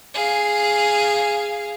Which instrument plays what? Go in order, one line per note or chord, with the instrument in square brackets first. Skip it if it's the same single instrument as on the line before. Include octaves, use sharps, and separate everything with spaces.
[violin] G#4 F5